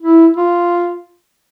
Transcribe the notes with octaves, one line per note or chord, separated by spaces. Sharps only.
E4
F4